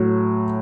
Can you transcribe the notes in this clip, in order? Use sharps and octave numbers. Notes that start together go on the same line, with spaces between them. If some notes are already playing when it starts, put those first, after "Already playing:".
Already playing: A2 F#3